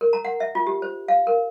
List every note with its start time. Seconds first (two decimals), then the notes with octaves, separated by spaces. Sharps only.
0.01 A#4
0.13 A#5
0.25 F#5
0.40 E5
0.55 F4
0.67 G4
0.82 C5
1.08 F5
1.27 A#4